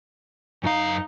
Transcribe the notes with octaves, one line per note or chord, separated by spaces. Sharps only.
F#2 D#4 F5